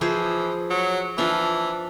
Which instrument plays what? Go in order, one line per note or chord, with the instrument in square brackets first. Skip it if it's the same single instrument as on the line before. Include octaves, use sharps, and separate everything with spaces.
[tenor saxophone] E3 [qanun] F3 G#4 C5
[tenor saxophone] F#3
[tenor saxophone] E3 [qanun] F3 D4 F5